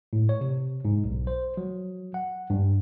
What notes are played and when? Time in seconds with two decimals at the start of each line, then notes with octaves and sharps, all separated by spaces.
0.13 A2
0.29 C#5
0.41 C3
0.85 G#2
1.04 B1
1.27 C5
1.57 F#3
2.14 F#5
2.50 G2